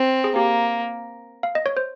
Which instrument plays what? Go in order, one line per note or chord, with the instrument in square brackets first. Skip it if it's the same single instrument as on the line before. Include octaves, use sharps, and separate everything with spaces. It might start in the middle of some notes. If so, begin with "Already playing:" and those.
Already playing: [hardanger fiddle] C4
[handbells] G#4
[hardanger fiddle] A#3 [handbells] G4
[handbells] F5
D#5
C#5
C5